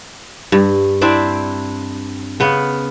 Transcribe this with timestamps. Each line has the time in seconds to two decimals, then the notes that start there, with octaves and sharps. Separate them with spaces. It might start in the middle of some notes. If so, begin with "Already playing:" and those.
0.52 G2
1.01 C4 D4 E4 D5
2.40 C#3 B3